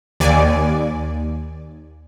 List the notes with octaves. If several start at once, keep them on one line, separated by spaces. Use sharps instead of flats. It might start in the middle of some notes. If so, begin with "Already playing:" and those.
D#2 D5 G#5